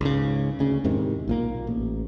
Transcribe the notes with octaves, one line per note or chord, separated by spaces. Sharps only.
C#2 G#2 C#3
D2 C#3
E2 G#2 C3 D#3
B1 A#2 A#3
A1